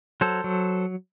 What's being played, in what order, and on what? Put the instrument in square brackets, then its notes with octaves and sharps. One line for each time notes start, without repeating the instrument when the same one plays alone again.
[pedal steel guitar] F#3 A4 C5
F#3